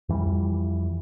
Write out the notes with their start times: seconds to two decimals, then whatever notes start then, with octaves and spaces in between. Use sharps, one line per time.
0.09 F2 E3 G3